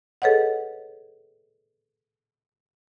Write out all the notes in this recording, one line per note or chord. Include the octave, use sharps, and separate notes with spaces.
G#4 A4 B4 C#5 D#5 F#5